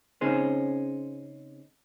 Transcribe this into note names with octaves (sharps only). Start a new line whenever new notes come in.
C#3 C4 C#4 D#4 G#4 C5